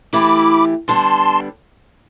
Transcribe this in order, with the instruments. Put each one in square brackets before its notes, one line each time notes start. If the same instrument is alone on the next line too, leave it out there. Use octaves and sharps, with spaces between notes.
[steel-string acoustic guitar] E3 A3 E4 G4 [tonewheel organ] B5 D6
[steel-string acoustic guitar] D3 G3 B3 [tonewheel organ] A5 C6